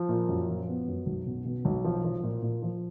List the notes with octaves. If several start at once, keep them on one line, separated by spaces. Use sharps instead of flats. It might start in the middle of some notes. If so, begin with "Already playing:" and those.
Already playing: F3
A#2
F#2
F3
B3
F#2
B1
B2
B2
B1
F3
F3
A#2
A#2
F3